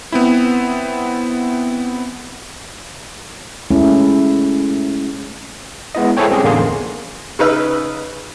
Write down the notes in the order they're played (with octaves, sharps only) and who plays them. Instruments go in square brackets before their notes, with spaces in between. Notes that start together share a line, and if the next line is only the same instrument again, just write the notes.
[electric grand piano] B3 C4 E4
[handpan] G#3 A3 C#4 E4
[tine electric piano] G#3 B3 E4 D#5
E4 G#4 A4 C5 C#5 G5
G3 C4 C#4 G4 G#4
A1 E2 D3 A#3 G#4 C6
[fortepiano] C#3 D#4 B4 E6 F6